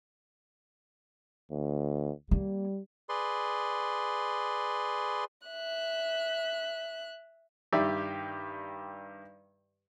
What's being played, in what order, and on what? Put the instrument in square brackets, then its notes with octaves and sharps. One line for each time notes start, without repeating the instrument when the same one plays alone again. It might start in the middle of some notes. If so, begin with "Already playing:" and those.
[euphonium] D2
[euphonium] G3 [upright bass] A#3
[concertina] G#4 B4 D5 C6
[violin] E5 F#6
[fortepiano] G2 D#3 G4 D5 E5